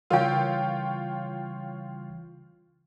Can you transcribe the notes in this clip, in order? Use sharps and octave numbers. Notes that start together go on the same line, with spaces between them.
C#3 E3 G3 F4 A#4 C#5 F5 G5